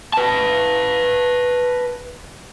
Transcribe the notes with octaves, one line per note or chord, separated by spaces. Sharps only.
B4 A5